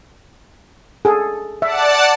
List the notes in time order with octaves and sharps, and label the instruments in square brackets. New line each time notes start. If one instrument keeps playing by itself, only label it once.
[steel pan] G#4 A4
[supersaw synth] D5 F#5 A5 [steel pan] E5